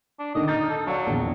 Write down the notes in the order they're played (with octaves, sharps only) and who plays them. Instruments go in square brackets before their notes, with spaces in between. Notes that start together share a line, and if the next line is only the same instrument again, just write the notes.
[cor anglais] D4
[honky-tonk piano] D3 D#3 [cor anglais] D#5
[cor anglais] D#4 [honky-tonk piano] F6 G6 A6
[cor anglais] A4
[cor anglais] F#3 [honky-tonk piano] D5 F5 A5
[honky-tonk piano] A#1 E2